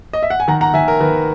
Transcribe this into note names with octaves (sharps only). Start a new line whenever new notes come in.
D#5
E5
F#5
G#5
D#3 F#5 A#5
F#5 A#5
D#3 E5 G#5
A#4
D#3 B4